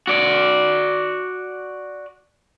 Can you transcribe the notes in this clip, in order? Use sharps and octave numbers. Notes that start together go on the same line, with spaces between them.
F#4 D5